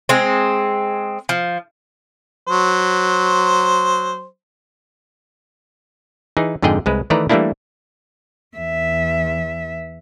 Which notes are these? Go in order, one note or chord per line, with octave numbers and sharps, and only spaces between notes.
G#3 C4
F3
F#3 C5
E3 D#4 G#4
F2 G#2 D3 G#4 D#5 G5
C2 G#3 B4
D#3 E3 A3 B4 D5 A#5
E3 G3 A3 A#3 D4 E4
E2 E5